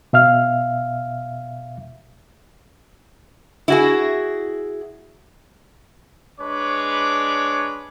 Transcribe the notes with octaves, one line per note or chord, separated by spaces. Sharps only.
B2 E5 F5 F6
E4 F#4 G#4
G#3 D4 B4 C#5 D6